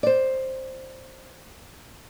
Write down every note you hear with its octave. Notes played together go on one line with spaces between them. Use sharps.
C5 D5